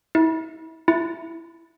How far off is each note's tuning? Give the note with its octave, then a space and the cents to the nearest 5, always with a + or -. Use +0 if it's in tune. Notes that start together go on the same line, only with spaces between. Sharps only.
E4 -35
E4 +10